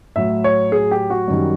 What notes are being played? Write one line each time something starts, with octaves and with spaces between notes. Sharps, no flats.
A2 F#3 E5
C#5
G#4
G4
F#4
F#2 D#3 G3